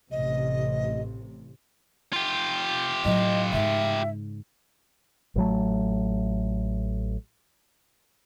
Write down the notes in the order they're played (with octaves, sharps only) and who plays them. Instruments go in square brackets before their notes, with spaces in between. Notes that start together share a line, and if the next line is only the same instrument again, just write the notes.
[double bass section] A1 C3 [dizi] D#5
[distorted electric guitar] F4 G4
[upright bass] A2 F#3 [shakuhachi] D#5
[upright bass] G#2 C#3 [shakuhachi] E5
[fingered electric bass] A1 F#3 A3